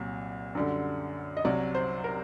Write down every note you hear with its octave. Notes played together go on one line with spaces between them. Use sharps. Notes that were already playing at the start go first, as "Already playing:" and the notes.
Already playing: C2 A#2 F#3
F#2 D3 G3
D#5
C2 C3 F#3 D5
C5
A#4